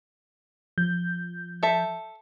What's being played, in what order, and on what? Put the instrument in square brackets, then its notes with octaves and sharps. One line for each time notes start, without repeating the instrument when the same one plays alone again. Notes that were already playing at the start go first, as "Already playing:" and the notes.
[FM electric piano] F3 G6
[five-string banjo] A4 E5